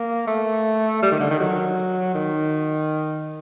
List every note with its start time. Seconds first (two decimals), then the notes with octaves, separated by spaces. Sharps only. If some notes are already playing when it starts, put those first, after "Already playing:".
Already playing: A#3
0.27 A3
1.02 G3
1.12 D#3
1.20 D3
1.30 D#3
1.40 F#3
2.15 D#3